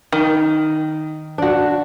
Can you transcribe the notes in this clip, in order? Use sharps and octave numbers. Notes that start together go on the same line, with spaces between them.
D#3
D4 F#4